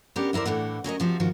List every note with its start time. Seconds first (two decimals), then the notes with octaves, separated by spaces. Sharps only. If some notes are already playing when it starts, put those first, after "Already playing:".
0.16 B3 C#4 D4 G4 A#4
0.33 E2 E4 A#4 C5 D5
0.46 A2 D3 E3 F#5
0.84 F#3 C#4 A#4 D#5
1.00 C3 F3 F#4
1.20 G#2 D#3 F3 F#4